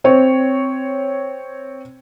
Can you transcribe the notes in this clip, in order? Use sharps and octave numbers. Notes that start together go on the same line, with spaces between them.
C4 C#5